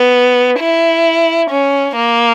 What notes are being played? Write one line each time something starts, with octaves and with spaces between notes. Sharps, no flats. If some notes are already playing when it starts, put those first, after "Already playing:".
Already playing: B3
E4
C#4
A#3